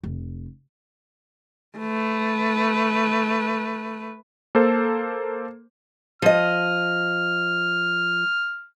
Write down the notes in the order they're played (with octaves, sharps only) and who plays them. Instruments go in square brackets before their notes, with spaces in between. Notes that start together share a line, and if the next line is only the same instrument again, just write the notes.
[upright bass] F1
[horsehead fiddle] A3 B4
[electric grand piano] A#3 A4 C5
[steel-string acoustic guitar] F3 D#5 [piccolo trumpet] F6